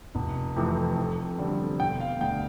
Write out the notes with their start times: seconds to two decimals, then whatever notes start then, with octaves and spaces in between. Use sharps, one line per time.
0.15 F1
0.56 F2 C3 E3 A3
0.97 F2
1.39 D3 G3 C4
1.80 E1 G5
2.00 F5
2.20 D2 D3 G5